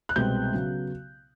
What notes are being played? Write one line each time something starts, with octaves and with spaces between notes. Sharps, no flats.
F#6
C2 B2 G#3 C4 G6
C#3 F#3 B3